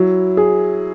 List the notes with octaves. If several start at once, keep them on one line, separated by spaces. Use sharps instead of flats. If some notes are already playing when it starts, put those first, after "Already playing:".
Already playing: F#3 E4
G#4